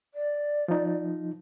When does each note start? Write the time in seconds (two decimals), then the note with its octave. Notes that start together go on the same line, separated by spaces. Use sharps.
0.14 D5
0.68 F3 D#4